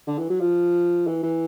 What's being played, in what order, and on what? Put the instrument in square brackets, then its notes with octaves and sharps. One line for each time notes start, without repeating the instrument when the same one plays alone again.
[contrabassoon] D3
E3
F#3
F3
E3
E3